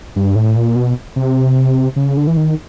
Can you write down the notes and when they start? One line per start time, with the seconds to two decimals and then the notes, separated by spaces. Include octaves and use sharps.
0.16 G2
0.36 A2
0.56 A#2
0.76 B2
1.16 C3
1.96 C#3
2.17 D3
2.27 E3
2.37 D#3